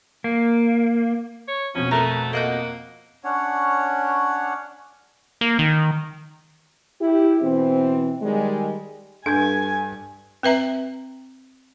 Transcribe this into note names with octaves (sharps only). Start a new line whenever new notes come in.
A#3
C#5
F2 B2 C#4
A3 A#4 B4
A#3 D#5 F#5 G6
C#4 D4 C#5 F#5
A#3
D#3
E4 G4
B2 E3 C4
D#3 G3 G#3
G2 D4 A4 G#5 G6 G#6
C4 B4 E5 A#5